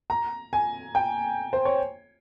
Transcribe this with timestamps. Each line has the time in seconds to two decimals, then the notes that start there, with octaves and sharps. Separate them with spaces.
0.10 A#5
0.53 G#5
0.95 G5
1.53 C5
1.65 C#5